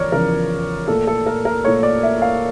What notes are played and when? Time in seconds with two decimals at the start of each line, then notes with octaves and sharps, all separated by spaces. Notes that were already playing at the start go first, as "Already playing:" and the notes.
Already playing: E2 C#3 F3 A#4 C#5 D5
0.12 E2 C#3 F3 A#4
0.88 A#2 A3 A4
1.07 A4
1.26 A#4
1.45 A#4
1.65 A#2 A3 C#5
1.83 D5
2.03 E5
2.22 F5